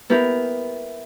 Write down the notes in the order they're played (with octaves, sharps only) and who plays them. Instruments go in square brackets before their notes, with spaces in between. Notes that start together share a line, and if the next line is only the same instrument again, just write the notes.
[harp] B3 E4 G4 A#4